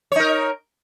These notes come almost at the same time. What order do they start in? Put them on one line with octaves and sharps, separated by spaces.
C#5 D#4 A#4